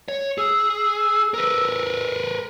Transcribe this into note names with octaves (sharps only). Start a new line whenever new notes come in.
C#5
G#4 E6
A#4 B4